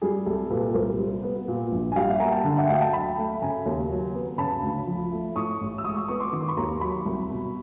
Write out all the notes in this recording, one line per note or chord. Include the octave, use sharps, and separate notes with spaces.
G3 G#4
C2 G4 A4
A#2 A4 B4
B4
C2 A#4 C5
G3
B3
A#2
A#1
G#5
G3 F5 G5
E5 F#5
A#3 G#5 A#5
G5 A5
D3
E5 F#5
D2 F5 G5
G5 A5
F#3 A5 B5
A3
C#3 G#5 A#5
D#2
F#3
B3
C#3 A5 B5
D2
F3
A3
A2 C#6 D#6
A1
E6
G#3 C#6 D#6
C#6 D#6
B3 C#6 D#6
C6 D6
D#3 C#6
D6
B5 C#6
D#2 A#5 C6
F#3 B5 C#6
C2
B2